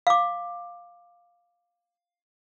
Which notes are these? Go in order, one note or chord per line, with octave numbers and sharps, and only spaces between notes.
F5 D6